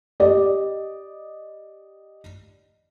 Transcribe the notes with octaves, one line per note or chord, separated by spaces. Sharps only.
G4 D5 D#5